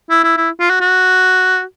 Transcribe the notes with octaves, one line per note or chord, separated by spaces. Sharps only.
E4
E4
E4
F4
F#4
F#4